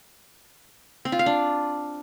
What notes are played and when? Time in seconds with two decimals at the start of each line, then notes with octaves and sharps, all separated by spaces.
1.05 C4
1.12 F4
1.19 F5
1.26 D4